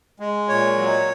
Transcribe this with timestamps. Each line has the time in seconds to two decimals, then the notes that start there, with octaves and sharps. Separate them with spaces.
0.20 G#3
0.49 A#2 C#5
0.77 F#3